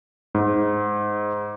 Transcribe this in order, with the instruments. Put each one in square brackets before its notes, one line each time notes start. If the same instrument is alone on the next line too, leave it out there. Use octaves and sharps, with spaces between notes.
[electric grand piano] G#2